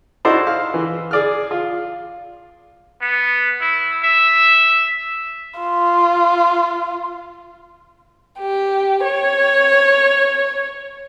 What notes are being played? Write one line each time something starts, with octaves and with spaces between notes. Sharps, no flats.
D#4 E4 F#4 A4 C5 D5
F5
E3
G#4 D5 F6
F4
B3
E4
E5
F4
G4
C#5